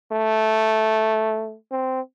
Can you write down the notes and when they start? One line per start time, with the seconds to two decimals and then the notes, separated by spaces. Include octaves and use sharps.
0.12 A3
1.71 C4